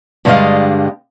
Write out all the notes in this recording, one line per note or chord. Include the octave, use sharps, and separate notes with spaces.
G2 D3 G3 G#3 D#5 F5